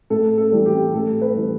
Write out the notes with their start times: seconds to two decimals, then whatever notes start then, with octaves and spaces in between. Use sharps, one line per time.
0.10 A2 A4
0.38 A4
0.52 E3 G3
0.66 G4
0.93 A2 A4
1.21 B4
1.35 E3 G3